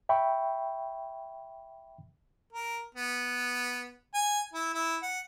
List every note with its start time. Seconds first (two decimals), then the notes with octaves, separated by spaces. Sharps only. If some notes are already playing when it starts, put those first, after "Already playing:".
0.09 E5 G5 B5 C#6
2.53 A#4
2.95 B3
4.14 G#5
4.54 E4
4.74 E4
5.02 F#5